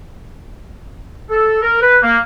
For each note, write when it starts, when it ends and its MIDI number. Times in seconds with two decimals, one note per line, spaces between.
1.31 1.60 69
1.62 1.79 70
1.82 1.98 71
2.03 2.18 58